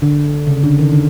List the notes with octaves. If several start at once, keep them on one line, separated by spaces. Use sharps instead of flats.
D3
C#3
D3
D#3
D3